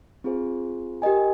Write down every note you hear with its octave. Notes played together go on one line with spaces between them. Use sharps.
C4 F4 G#4 C5
G4 A#4 D#5 G#5